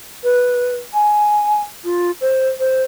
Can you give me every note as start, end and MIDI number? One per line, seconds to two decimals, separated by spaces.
0.23 0.72 71
0.93 1.62 80
1.84 2.11 65
2.21 2.48 72
2.59 2.82 72